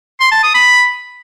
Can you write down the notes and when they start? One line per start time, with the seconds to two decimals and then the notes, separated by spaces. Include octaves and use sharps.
0.20 C6
0.32 A5
0.43 D#6
0.54 B5